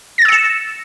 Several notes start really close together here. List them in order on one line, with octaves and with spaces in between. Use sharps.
A#6 A6 E6 C#7 E7